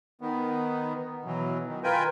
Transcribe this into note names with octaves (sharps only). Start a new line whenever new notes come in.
D#3 B3
B2 E3 F#3
D#3
F4 A#4 B4 G5 G#5